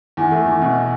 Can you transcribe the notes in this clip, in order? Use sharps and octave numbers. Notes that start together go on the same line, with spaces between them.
E2
A3
E2
B2